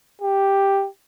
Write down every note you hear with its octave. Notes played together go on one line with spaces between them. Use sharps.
G4